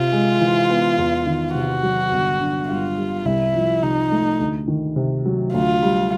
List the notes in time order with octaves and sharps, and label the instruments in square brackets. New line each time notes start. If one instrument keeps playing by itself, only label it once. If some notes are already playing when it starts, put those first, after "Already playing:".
Already playing: [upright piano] C3 [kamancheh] F4
[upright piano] G#3
E3
B3
E2
D#3
[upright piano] C3 [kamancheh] F#4
[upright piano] F#3
G1
D3
[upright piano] G2 [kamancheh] F4
[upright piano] G3
[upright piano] C2 [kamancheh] E4
[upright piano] F3
[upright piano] C3 [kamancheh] D#4
[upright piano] A3
D2
D#3
C3
F#3
[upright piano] D2 [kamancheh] F4
[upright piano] G3